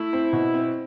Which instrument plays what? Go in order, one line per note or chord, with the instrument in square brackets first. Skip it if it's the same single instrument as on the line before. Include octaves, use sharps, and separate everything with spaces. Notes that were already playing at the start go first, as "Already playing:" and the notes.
Already playing: [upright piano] A3 [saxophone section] E4
[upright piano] C4
B2
C4